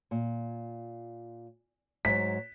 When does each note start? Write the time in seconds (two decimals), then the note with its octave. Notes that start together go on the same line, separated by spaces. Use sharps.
0.11 A#2
2.05 G#2 F#3 B6